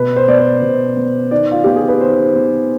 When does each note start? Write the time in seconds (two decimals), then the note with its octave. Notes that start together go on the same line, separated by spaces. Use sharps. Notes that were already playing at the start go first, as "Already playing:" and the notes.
Already playing: B2 B4
0.16 C5
0.28 B3 D5
0.39 C5
0.62 B2
0.97 B3
1.31 D#3 D5
1.52 F4
1.64 B3 G4
1.76 G#4
1.88 B4
2.01 D#3 C5
2.36 B3